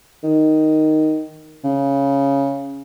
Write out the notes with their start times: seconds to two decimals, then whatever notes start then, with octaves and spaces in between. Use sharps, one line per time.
0.24 D#3
1.64 C#3